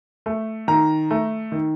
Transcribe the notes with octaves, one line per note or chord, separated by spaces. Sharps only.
A3
D#3 A#5
A3
D#3